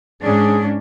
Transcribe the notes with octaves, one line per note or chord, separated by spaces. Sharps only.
G#2 C#4 D4 G#4